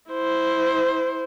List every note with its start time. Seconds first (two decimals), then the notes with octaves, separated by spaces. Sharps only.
0.11 E4 C5